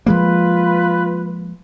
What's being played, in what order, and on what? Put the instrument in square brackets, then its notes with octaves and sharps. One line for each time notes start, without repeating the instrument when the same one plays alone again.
[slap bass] F3 G#3 A#3 [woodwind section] F4 B4